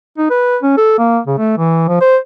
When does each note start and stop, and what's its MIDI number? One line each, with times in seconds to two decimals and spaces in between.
0.18 0.28 63
0.30 0.57 71
0.63 0.73 61
0.77 0.94 69
0.98 1.19 58
1.27 1.38 49
1.38 1.56 57
1.58 1.88 52
1.88 1.99 53
2.01 2.17 72